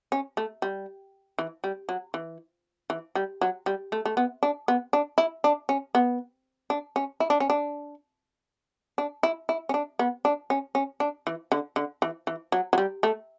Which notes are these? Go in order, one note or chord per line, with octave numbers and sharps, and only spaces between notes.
C#4
A3
G3
E3
G3
F#3
E3
E3
G3
F#3
G3
A3
A3
B3
D4
B3
D4
E4
D4
C#4
B3
D4
C#4
E4
D4
C#4
D4
D4
E4
E4
C#4
D4
B3
D4
C#4
C#4
D4
E3
D3
D3
E3
E3
F#3
F#3
G3
A3